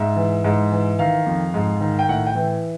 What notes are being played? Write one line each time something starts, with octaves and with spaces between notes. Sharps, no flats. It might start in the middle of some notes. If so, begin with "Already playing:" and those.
Already playing: G#2 E5
E3
G#2
E3
D#3 F5
F2
G#2
D#3
G5
A2 F#5
G5
E3